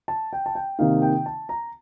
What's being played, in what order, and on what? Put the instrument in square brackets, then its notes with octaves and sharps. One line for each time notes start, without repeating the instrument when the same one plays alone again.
[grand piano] A5
G5
A5
G5
C3 D#3 A#3 D#4 F5
G5
A5
A#5